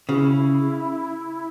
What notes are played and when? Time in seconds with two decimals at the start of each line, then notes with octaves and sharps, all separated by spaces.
0.09 C#3 F#4
0.14 E4